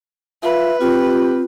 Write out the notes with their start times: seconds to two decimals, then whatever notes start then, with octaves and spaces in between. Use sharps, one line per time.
0.43 F4 B4 E5
0.81 C4 F4 G4